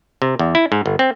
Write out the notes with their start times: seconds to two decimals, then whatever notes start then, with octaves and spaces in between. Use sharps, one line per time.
0.22 C3
0.39 E2
0.55 E4
0.72 G#2
0.86 G1
0.99 C4